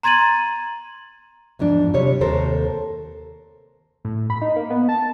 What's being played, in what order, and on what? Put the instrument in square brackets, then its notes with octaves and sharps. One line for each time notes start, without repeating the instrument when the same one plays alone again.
[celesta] A#5 C6 G#6 A6 D#7 F#7
[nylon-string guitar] E2 G#2 F3 D4
C3 G3 C#5
D#2 C3 A4 A#4 C5
[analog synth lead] A2
B5
D#4
A#3
B3
A5